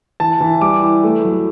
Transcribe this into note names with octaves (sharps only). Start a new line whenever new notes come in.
E3 A5
E3
G3 D6
E4
A3
F#3